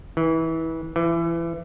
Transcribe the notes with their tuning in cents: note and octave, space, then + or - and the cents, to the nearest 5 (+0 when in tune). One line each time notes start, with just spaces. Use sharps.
E3 -25
E3 +25